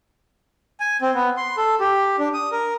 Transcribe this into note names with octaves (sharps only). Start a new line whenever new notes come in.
G#5
C4
B3
C6
A4
G4
D4
D#6
A#4